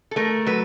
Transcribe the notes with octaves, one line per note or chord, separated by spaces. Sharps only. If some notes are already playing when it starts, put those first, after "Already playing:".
A4
A3 A#4
F#3 B4